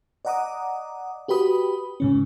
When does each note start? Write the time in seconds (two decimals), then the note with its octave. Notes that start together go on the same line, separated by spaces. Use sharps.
0.25 D5 D#5 F#5 A#5 D6 D#6
1.28 F#4 G4 B4 B5 D#6
2.00 G#2 C#3 C#4